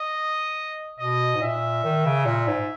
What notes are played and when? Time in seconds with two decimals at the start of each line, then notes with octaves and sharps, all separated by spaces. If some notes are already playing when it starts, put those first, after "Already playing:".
Already playing: D#5
0.99 B2 D#5
1.35 G#2
1.41 A#2 E5
1.84 D#3
2.05 C#3
2.26 A#2
2.48 G#2